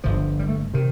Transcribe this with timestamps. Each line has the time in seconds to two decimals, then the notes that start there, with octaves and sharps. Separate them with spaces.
0.04 G1 G2 D3 F3
0.39 G3
0.48 A3
0.74 C3 D#3